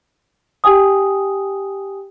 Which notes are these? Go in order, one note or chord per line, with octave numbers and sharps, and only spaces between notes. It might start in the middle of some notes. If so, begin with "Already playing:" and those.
G4 G5 G#5 D#6